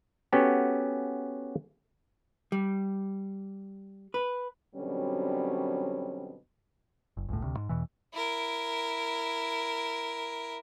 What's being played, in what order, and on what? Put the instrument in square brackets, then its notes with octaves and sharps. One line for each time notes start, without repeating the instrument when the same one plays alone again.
[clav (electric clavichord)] B3 C#4 F#4 G4 A4
[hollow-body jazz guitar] G3
B4
[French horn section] B2 D3 F#3 G3 C4 C#4
[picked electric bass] F#1
G1 C#2 A2
D2 C3
G#2
E2 B2 E3
[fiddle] E4 A#4